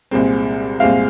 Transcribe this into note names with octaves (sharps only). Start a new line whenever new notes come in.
C2 A#2 G#3 C4
C2 A#2 G#3 C4 F5